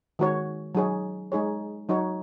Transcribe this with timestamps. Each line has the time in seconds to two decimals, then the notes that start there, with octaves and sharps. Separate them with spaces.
0.19 D#3 G#3 F#4 C#5
0.75 F#3 D#4 G#4 C#5
1.32 G#3 D#4 G#4 C#5
1.89 F#3 D#4 F#4 C#5